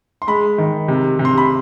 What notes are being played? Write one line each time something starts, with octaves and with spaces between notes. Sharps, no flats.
C6
G#3 B5
D#3
C3
C3
C6
B5